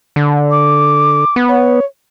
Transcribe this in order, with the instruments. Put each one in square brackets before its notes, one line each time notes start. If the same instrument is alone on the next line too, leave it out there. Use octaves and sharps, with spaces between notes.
[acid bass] D3
[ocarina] D6
[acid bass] B3
[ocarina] C#5